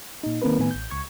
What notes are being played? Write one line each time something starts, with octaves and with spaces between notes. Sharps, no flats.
A#2 D#4
D#3 A#3 C4 A#4 B4
A2 D#3 B3 B4 G#5
A1 G6
C#2 C#6 G#6